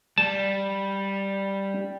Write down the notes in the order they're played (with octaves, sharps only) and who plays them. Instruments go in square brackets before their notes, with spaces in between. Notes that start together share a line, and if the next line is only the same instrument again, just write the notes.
[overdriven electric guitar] G3 [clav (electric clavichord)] A5